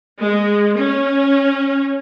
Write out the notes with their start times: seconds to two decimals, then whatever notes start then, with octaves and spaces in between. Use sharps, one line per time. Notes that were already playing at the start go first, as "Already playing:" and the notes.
0.19 G#3
0.77 C#4